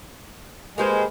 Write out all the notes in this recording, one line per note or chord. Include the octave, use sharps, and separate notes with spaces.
G#3 A#3 G4 B4 C5